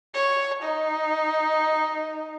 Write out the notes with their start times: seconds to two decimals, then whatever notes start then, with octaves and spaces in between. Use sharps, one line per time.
0.15 C#5
0.64 D#4